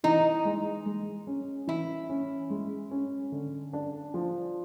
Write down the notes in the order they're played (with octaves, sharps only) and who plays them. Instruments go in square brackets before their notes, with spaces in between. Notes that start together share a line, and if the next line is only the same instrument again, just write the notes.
[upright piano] E3 [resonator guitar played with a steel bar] D#4
[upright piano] G#3
G#3
C#4
[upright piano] E3 [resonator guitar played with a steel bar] E4
[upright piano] C#4
G#3
C#4
D3
D4
F3